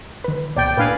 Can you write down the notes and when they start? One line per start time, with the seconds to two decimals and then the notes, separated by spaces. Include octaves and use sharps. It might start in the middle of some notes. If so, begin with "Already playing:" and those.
0.24 D#3 B4
0.57 C#2 B2 D5 G5 G6
0.77 A#2 D4 B4 F5 G#5